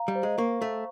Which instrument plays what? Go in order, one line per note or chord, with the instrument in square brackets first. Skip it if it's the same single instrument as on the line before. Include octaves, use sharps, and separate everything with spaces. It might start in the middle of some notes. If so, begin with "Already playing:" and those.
Already playing: [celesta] F5 A#5
[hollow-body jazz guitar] G3
[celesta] C5
[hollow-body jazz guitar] G#3
[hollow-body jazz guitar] A#3 [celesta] C#6
[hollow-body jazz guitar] A3 [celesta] F5